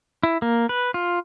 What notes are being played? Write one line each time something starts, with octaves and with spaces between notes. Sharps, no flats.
E4
A#3
B4
F4